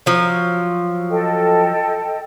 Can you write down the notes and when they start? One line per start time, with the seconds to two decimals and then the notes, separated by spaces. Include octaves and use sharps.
0.06 F3 F#3
1.10 A4 D#5 G5